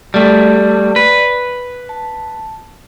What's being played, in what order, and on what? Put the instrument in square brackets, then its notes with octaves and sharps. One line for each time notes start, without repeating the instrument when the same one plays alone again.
[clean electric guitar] G3 A3 [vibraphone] D5
[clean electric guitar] B4
[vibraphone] A5